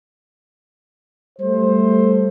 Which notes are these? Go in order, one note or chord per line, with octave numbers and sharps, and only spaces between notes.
G3 A3 C5